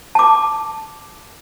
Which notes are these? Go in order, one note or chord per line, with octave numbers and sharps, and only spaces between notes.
A5 D6